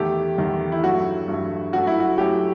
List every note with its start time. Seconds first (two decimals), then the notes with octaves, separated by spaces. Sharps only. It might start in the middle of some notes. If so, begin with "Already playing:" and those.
Already playing: E2 D#3 A3 G4
0.38 E2 D#3 A3
0.72 E4
0.83 G2 F#3 A3 F#4
1.28 G2 F#3 A3
1.73 F#2 F#3 A3 F#4
1.87 E4
2.00 F#4
2.18 F#2 F#3 A3 G4